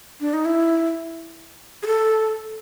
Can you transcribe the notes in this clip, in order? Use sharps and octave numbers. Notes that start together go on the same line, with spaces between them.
D4
D#4
E4
G#4
A4